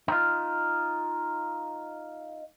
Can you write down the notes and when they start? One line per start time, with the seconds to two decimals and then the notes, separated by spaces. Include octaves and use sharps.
0.08 D#4 F4